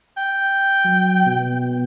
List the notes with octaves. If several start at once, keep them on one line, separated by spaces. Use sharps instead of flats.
G5
F#3
B2